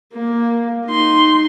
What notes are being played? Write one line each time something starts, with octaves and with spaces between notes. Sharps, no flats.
A#3
D#4 C6